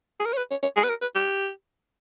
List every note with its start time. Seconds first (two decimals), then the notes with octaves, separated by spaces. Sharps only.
0.20 G#4
0.26 A#4
0.33 C#5
0.37 B4
0.51 C#5
0.63 C#5
0.76 G#4
0.84 B4
0.89 A#4
1.02 B4
1.15 G4